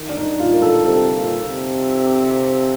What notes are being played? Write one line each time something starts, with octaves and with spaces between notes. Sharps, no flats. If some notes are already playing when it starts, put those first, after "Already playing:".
Already playing: D#3
D4
D#4
A#2 F4
A#4
A4
C3 A4
A#2
C3